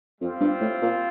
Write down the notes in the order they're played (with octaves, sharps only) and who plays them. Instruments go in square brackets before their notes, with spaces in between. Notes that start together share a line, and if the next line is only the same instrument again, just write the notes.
[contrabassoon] F2 [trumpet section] G3 C4 F4 C5
[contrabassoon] G2
A2
A#2